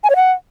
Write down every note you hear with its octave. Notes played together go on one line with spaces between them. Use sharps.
G#5
C#5
F#5